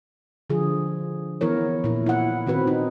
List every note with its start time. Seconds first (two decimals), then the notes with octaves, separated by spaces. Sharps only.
0.50 D3 F3 F4 G#4
1.41 E3 B3 E4 A#4 C#5
1.84 A#2 E4
2.06 E4 F#5
2.47 D#3 C4 F#4 B4
2.67 D#4